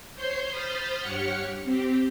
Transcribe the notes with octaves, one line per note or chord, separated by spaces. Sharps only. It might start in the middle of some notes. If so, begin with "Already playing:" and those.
C5 C#5 C6 G6 C7
C5 B5 D#6 F6 G6 A6
G2 G4 C#5 F#5 F6 C#7
C4 G4